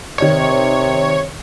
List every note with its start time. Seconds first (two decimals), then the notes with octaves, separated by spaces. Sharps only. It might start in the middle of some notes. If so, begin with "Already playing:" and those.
0.18 C3 D#3 C#5 D5 G#6